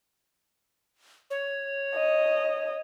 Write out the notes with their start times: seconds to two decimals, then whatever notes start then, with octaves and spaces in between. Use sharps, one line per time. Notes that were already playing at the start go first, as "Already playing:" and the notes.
1.30 C#5
1.95 D#5